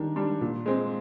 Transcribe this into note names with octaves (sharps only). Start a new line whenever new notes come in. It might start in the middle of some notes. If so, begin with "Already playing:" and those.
Already playing: D#3 G3 D4
G3 D4
A#2
G#3 C4